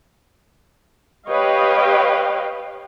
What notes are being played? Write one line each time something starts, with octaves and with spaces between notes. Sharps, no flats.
G4 B4 C#5 D#5 F5 G5